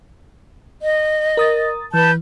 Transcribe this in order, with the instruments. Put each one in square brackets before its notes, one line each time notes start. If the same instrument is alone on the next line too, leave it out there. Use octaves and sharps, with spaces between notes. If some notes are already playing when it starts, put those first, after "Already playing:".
[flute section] D#5
[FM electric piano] A#4 D#6 A6
[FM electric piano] E3 [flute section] B4 A5 G6